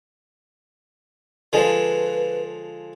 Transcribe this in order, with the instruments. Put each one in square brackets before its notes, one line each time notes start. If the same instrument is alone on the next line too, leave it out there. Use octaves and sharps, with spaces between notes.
[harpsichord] D3 F3 G#3 [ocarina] B4